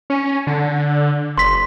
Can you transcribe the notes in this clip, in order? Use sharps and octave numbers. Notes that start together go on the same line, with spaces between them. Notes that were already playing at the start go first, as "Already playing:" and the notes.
C#4
D3
F#1 C6 B6